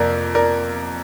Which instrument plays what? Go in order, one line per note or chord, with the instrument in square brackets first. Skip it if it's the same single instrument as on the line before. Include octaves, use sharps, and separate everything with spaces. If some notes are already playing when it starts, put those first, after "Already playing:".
Already playing: [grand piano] F2 C3 A#3 A#4 D5
A#4 D5